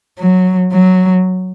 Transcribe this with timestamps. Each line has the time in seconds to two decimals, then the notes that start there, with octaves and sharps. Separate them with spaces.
0.20 F#3
0.73 F#3